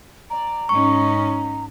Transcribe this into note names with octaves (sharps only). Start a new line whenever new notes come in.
D5 A#5
G#2 C#4 D#4 C#6